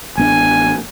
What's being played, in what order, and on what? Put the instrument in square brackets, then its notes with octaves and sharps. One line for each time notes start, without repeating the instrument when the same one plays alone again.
[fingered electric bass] A1 B3 D4 [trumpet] G#5